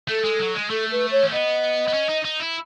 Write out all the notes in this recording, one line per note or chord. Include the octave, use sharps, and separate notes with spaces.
A3 A4
G#3
F#3
G#3
A3 A4
B4
C#5
C#4
B3 D#5
B3
C#4
D#4
D#4
E4